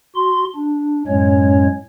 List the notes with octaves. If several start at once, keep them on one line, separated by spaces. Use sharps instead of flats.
F#4 C6
D4
F#2 A2 F#3 G#3 C#4 C#5